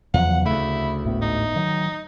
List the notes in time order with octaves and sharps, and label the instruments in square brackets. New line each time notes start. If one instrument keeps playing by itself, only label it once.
[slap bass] E2 [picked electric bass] C#3 F3 F#3 [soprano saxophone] F#5
[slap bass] D2 A3 [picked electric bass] C#3 [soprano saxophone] E4
[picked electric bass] G#1 A2 B3
[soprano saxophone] D#4
[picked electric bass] D#3 F#3